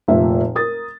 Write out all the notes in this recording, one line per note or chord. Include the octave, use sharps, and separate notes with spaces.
F1 A#2 E5
A#4 D#6 A6